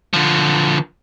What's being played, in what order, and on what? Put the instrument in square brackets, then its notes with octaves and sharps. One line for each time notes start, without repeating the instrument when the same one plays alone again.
[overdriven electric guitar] D3 F3